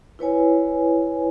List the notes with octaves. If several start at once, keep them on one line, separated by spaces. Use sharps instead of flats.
E4 B4 C#5 G#5